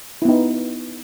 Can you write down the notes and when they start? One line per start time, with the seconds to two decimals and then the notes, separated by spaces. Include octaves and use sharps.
0.22 E4
0.25 B3
0.28 D#4